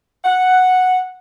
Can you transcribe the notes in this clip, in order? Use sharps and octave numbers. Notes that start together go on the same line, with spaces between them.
F#5